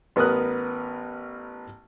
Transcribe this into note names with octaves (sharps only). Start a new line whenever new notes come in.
A1 B3 A#4 D#6 F#6